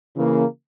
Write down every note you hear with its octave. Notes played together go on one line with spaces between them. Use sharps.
C#3 E3 A#3